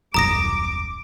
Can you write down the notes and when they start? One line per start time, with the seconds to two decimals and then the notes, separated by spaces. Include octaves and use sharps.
0.14 D#1 B1 F#2 A#5 D6 D#6 A#6